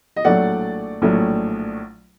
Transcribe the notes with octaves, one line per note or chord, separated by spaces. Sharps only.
D#5
A#1 A2 F#3 A3 D5 F#5
A#1 A2 F#3 A3